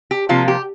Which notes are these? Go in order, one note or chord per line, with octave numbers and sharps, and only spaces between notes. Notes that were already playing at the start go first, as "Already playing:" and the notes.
G4
C3 F3 A#3 F4
G4